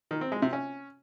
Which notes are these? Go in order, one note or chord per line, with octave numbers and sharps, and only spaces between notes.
D#3
C4
G#3
C3
C#4